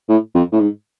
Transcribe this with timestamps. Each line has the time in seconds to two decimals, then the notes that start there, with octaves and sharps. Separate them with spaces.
0.09 A2
0.35 F2
0.52 A2
0.60 G#2